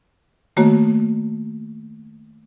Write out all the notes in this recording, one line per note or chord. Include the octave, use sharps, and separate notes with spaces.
D#3 A3 A#3 F#4 C#5